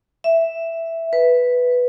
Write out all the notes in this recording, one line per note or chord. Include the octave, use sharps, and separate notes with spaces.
E5
B4